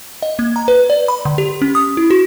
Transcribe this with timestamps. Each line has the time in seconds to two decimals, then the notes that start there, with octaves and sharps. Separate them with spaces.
0.23 D#5
0.39 A#3
0.56 A#5
0.68 B4
0.90 D5
1.08 B5
1.25 D3
1.38 G4
1.62 C#4
1.75 D#6
1.97 E4
2.11 F#4